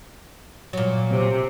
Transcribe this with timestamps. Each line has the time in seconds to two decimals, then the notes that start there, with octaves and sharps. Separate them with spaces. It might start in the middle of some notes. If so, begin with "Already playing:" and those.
0.73 A#2 F#3
1.11 C3